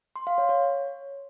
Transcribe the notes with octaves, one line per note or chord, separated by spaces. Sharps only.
C6
F5
C#5
C#5